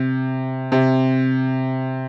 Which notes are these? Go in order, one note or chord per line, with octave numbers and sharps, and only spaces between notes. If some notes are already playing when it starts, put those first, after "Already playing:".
Already playing: C3
C3